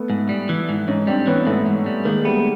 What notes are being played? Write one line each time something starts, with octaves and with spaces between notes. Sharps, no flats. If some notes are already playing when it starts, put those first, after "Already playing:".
Already playing: A3 B3
G#2
G3
E3
G#2
G#2 C#4 D#4
G3 C4 D4
E3 B3 C#4
G#2 A3 B3
G#2
G3
D#3 G#3 A#3
G3 A3 B3